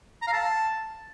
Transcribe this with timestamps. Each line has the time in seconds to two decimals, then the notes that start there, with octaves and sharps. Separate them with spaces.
0.22 A#5
0.27 F5
0.33 A5